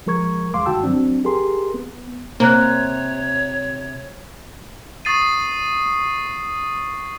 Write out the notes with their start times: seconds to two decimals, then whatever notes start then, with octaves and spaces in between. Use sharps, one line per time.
0.06 F3 G#3 A#4 C#6 G#6
0.54 E2 G#3 F5 C6 D6
0.66 G2 D#3 F#4 G5 A5 E6
0.83 F#3 C4 D4
1.25 G4 G#4 A#4 C6
1.74 B3
2.40 C3 A#3 C5 C#5 A#5 F#6
5.05 C#6 D#6 A6 C7 D#7